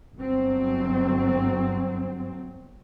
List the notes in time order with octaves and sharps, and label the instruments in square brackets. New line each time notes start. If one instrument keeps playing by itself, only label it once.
[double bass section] G1 F#3 C4